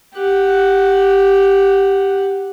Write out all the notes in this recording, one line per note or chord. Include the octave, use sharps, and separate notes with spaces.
G4 F#5